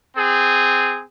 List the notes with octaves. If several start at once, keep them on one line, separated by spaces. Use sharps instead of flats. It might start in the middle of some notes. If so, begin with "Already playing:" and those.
C4 G#4